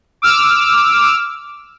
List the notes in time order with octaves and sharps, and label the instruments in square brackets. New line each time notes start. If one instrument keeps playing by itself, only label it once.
[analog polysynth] D6 E6 F6